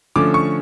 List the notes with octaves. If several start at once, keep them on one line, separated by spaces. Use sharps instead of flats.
D3 F3 A3 C#4 D6
C#6